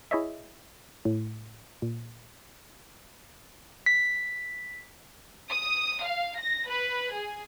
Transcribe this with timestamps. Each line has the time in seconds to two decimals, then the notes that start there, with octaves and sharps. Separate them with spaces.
0.11 E4 G#4 C#5 D#5 E5
1.05 A2
1.82 A#2
3.86 B6
5.49 D#6
6.04 F5
6.39 A#6
6.70 B4
7.14 G#4